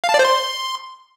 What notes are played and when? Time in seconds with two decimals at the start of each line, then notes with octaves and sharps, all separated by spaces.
0.04 F5
0.09 A5
0.14 D5
0.19 C5
0.25 C6